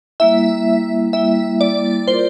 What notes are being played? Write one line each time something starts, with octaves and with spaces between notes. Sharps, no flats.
G3 A#3 E4 E5
G3 A#3 E4 E5
D5
F4 A#4 C5 D5